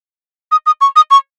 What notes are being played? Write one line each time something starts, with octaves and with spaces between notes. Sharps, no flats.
D#6
D#6
C#6
D#6
C#6